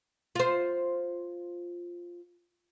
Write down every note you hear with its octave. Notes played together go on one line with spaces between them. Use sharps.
F4 C5